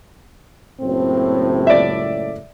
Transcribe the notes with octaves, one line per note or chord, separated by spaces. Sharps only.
F#1 C#2 A2 C4
D5 E5